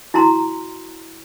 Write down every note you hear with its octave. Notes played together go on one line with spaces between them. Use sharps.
E4 F#4 A#5 C6